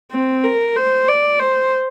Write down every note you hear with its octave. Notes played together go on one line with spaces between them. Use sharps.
C4
A#4
C5
D5
C5